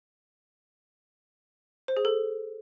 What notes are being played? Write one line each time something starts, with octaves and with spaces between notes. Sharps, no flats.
C5
G#4
A4